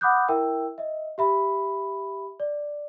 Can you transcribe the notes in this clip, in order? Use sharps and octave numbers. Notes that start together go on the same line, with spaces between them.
F#5 B5 D6 D#6 F#6 G6
E4 A#4 E5 G5 E6
D#5 E5
G4 E5 B5
D5